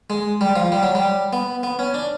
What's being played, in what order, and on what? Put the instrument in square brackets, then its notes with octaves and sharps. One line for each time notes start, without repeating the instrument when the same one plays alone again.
[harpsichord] G#3
G3
F3
G3
F#3
G3
B3
B3
C#4
D4